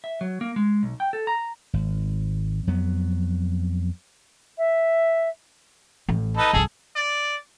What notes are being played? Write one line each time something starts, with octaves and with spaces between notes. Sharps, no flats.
E5
F#3
A#3
G#3
B1
G5
A4
A#5
G#1
F2 F#3 B3
E5
A1
D#4 A4 B4
C2 G2 G#4 A4
D5